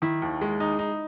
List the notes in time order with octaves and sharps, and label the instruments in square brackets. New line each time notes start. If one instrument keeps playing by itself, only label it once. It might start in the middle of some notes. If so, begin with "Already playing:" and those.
[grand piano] D#3 [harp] E4
[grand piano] D#2
G#3
D#4
D#4